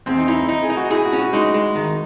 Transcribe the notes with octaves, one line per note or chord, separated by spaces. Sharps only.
E2 C4
D#4
D#4 E4
D#4
G#4
D#4
F#4
E4 G#4
F#4
C#4
F#4
G#3 D#4
G#3
D#3